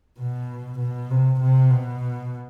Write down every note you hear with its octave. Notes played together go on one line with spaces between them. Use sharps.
B2
B2
C3
C3
B2